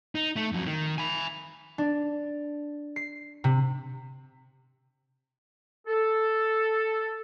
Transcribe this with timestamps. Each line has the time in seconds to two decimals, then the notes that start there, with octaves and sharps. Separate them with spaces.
0.15 D#4
0.36 A3
0.52 F2 F#3
0.66 D#3
0.98 G#5 B5
1.78 D4
2.96 C7
3.44 C3
5.87 A4